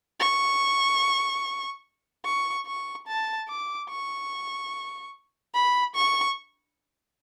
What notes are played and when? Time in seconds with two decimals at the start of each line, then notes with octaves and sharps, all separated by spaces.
0.20 C#6
2.25 C#6
2.67 C#6
3.07 A5
3.48 D6
3.90 C#6
5.54 B5
5.95 C#6